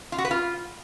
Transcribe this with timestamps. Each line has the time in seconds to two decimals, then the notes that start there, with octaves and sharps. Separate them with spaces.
0.12 F4
0.18 F#4
0.25 B4
0.31 F4